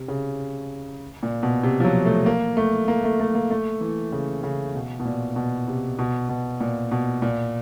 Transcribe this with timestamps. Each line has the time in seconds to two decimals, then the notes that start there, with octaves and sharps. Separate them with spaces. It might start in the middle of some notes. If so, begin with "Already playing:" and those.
Already playing: C3
0.08 C#3
1.23 A#2
1.43 B2
1.63 C3
1.80 F3
1.84 F#3
2.05 A3
2.26 A#3
2.57 A3
2.88 A#3
3.04 A3
3.20 A3
3.35 A#3
3.50 A3
3.81 E3
4.12 C#3
4.43 C#3
4.75 B2
4.99 B2
5.05 A#2
5.36 B2
5.68 C3
5.99 B2
6.29 B2
6.60 A#2
6.91 B2
7.22 A#2